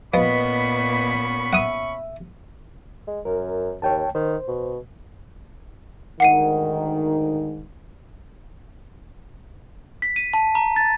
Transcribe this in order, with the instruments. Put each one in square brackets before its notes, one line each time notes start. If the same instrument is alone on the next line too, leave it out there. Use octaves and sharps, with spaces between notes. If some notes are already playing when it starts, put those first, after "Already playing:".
[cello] A#2 B3 [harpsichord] F3 [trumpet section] C#4 B5 C#6 [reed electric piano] B4 D#5
[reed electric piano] E5 [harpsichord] F#5 D#6
[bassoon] G#3
[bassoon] F#2 [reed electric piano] A#4
[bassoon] D#2 [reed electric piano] C#5 G5 A5
[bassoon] D#3 [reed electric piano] C5
[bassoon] B2
[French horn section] D2 G#2 D#3 [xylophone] F#5 C7 D#7
[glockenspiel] B6
D#7
A5
A#5
A6